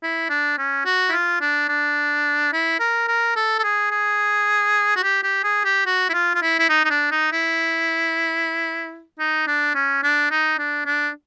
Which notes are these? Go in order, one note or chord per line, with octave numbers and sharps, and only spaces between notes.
E4
D4
C#4
F#4
E4
F4
D4
D4
E4
A#4
A#4
A4
A4
G#4
G#4
F#4
G4
G4
G#4
G4
F#4
E4
F4
F4
E4
E4
D#4
D#4
D4
D#4
E4
D#4
D4
C#4
D4
D#4
D4
D4